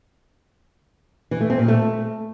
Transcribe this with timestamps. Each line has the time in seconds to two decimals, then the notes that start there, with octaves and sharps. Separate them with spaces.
1.31 E3
1.41 A3
1.50 C4
1.59 A#2
1.68 A3